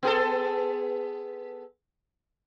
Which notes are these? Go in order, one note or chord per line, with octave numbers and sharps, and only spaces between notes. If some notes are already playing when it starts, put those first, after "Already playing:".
B3 G#4 A4